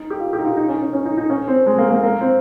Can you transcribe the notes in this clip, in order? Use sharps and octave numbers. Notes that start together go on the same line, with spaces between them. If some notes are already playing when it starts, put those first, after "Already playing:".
Already playing: D#4
G4
F4
G4
D#4
F4
D#4
C#4
C#4
C#4
D#4
D#4
C#4
C4
G#3
A#3
A#3
A#3
C4